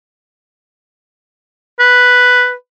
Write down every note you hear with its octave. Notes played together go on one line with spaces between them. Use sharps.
B4